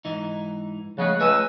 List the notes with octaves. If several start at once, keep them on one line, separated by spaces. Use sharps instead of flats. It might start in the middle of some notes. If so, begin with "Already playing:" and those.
G#2 E3 D#4
C#3 F3 G#3 A3 F#5
C#2 A3 B4 D#5 G#5 E6